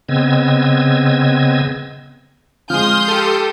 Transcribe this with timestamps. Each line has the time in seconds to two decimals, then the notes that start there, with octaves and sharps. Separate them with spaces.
0.09 C#3 B3 C4 D#5 E6 G#6
2.70 F3 G#3 C6 D#6 F6 G6
3.08 G4 A4